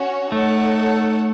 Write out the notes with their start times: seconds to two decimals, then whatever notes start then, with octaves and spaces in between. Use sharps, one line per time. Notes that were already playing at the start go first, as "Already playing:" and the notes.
Already playing: C#4 F#4 C#5
0.32 A3 D#4 A4 C#5 F#5